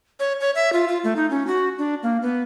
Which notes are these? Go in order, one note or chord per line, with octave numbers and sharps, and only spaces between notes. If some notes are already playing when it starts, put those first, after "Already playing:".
C#5
C#5
E5
F4
F4
A3
D#4
C#4
F#4
D4
A#3
B3